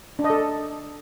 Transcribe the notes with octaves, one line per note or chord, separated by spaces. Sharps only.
D4
D#5
A4